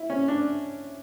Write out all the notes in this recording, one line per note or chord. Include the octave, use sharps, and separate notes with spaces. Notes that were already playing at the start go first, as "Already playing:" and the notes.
Already playing: E4
C#4
D4